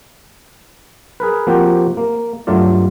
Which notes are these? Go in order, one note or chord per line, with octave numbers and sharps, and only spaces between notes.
G#4 A#4 B4
F3 A#3 C4 F#4 G4
A#3
G2 F#3 A3 F4 D5